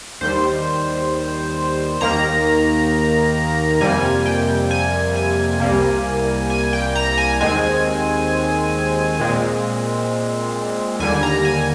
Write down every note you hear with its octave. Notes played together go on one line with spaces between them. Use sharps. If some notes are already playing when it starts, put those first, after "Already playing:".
D#2 D#3 G3 C5
D#2 D#3 A#3 A#5
F2 C3 G3 A#3 G#5
G5
G#5
G#5
C2 C3 G3 A#3
G#5
G5
A#5
G#5
D#2 D#3 G#3 C4 G#5
A#2 G#3 C4
D#2 D3 G3 A#3 G#5
A#5
G#5